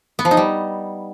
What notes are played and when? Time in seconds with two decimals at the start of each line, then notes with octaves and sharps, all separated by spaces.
0.19 B3
0.25 F3
0.31 D#4
0.37 G3